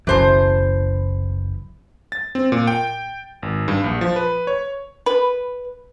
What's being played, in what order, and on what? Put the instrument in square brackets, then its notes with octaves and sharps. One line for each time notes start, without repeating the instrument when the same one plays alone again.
[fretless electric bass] F#1 B1 F#2 [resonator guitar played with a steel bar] E3 C5 A5
[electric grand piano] A6
C4
A#2
G5
G#1
G2
A#1
F3
B4
C#5
[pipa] B4